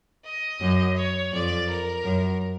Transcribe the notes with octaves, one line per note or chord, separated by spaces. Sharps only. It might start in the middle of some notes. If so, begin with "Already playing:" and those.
D#5
F#2
C#5
F2 D5
A#4
F#2